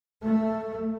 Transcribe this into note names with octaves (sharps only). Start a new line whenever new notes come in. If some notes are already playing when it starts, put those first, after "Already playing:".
A3